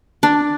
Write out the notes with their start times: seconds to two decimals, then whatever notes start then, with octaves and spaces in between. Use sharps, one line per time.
0.23 D4